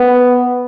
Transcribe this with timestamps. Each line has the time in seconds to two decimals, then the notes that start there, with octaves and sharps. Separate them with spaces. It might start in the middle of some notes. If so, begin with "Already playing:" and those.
Already playing: B3